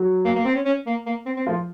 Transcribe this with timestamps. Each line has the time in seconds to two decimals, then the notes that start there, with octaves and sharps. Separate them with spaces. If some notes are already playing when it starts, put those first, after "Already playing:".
Already playing: F#3 F#4
0.25 A#3
0.36 A#3
0.45 C4
0.55 C#4
0.65 C#4
0.86 A#3
1.06 A#3
1.26 C4
1.37 C4
1.47 F3 A3 F4